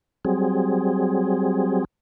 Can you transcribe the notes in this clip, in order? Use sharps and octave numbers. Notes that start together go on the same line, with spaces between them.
F#3 G3 C4 G#4